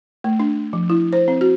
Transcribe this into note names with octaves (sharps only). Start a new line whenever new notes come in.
A3
D4
F3
E4
C5
C4
F#4